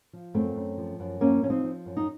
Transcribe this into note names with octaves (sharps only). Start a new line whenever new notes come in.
F3
F#2 A3 C4
F#2
F3
F#2
F3 A#3 C#4
F3 C#4
C4 D#4
F3
F#2
D#4